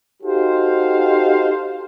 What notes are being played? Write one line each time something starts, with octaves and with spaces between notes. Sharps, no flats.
D#4 F#4 G4 A4 C5 F5